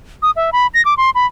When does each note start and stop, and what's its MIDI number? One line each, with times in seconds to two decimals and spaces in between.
0.22 0.31 87
0.36 0.50 76
0.52 0.67 83
0.74 0.84 94
0.85 0.94 86
0.97 1.10 84
1.15 1.26 83